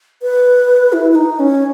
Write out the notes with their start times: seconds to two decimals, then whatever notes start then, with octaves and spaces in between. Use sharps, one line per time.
0.22 B4
0.93 E4
1.11 E4
1.15 D#4
1.39 C#4